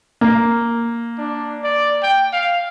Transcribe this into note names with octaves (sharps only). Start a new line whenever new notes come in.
A#3
D4
D5
G5
F5